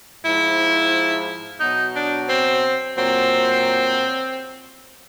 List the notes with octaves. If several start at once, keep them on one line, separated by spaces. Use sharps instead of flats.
G#2 F3 E4
B2 F#3 D#4
D4
C4
A#2 F#3 C4